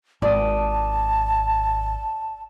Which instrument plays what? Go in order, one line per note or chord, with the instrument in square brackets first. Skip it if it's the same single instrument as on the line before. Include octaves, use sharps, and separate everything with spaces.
[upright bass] G#1 [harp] D5 D#6 [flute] A5